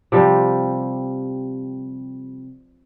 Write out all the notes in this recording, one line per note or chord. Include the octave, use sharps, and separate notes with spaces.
C3 F3 G3